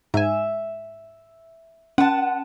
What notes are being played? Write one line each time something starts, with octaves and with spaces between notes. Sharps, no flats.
G#2 E5 G#5
C#4 F#5 A5